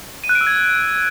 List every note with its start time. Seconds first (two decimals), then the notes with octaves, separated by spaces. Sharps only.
0.24 D#7
0.29 F#6
0.35 D7
0.41 E6
0.47 G#6